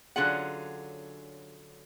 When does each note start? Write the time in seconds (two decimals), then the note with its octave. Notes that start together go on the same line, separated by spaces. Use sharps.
0.16 D3 F#3 C#4 F4 G#4 F#5